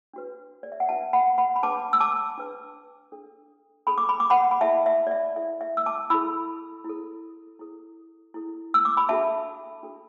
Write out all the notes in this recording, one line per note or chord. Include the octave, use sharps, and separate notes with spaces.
D4 F#4 B4
D5
E5
F#5
D4 F#4 B4 E5 A5
F#5 B5
F#5 B5
B5
D4 B4 A5 D6
E6
A5 D6
D4 B4
D4 A4
D4 A4 B5
D6
B5
D6
F#5 B5
B5
E4 A4 E5 A5
E5
D5
E5
E4 A4 E5
E5
E6
A5 D6
E4 A4 B5 E6
E4 A4
E4 A4
E4 A4
E6
D6
B5
D4 F#4 A4 E5 A5
D4 F#4 A4